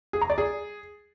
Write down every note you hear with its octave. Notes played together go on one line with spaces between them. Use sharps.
G#4
A#5
D5
G#4